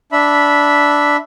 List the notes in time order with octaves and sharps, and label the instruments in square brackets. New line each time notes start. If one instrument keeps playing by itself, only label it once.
[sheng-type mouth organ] D4 E5 B5